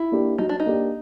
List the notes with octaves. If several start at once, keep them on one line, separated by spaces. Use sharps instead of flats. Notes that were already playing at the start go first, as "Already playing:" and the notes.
Already playing: E4
A#3 D4 G4
F#3 D#4
D4
D#4
A#3 D4 G4